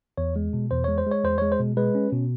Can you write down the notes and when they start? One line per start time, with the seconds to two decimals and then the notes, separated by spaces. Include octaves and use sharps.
0.17 E2 C#5
0.36 G#3
0.53 B2
0.71 E2 C5
0.84 G#3 C#5
0.98 C5
1.06 G#3
1.12 C#5
1.24 E2 C5
1.38 G#3 C#5
1.52 C5
1.59 B2
1.77 G#3 B4
1.95 C#4
2.12 B2